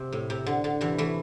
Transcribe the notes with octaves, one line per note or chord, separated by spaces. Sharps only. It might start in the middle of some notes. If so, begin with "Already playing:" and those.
Already playing: C3
A2
C3
D3
D3
C3 E3
E3 A3